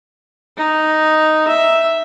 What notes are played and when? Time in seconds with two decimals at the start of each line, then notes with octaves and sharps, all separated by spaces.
0.57 D#4
1.48 E5